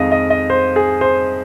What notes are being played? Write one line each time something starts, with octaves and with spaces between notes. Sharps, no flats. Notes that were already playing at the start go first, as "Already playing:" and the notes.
Already playing: F2 D#3 G#3 D#5 F5
D#5
D#5
C5
G#4
C5